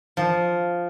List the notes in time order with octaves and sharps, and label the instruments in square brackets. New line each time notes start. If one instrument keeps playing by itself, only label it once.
[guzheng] F3